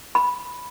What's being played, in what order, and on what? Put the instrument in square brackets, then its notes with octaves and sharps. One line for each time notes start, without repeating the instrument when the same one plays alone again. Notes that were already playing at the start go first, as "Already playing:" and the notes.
[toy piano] B5